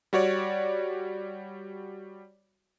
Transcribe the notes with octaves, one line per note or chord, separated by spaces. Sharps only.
G3 F#4 C#5 D5